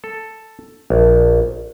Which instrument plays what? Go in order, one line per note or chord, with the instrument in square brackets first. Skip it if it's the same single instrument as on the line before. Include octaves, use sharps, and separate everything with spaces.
[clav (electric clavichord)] A4
A#1